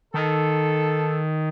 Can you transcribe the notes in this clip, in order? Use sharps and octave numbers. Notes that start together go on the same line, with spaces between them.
D#3 A4